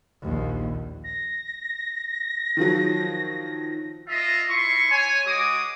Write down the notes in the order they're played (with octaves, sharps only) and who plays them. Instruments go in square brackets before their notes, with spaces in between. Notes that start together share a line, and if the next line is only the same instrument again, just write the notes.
[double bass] A#1 D#2
[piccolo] A#6
[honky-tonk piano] D#3 F3 F#3
[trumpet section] F4 D#5 E5
E4 C6 C#6
C#5 G#5
G#3 F#4 D6 D#6